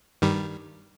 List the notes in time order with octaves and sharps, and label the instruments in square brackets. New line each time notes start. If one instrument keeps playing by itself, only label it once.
[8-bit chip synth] G2 D#3 G3